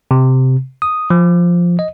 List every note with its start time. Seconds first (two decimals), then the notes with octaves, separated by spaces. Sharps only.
0.11 C3
0.82 D#6
1.10 F3
1.79 D#5